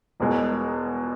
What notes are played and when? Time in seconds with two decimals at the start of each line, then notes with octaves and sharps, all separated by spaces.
0.20 E1 E2 B2 G#3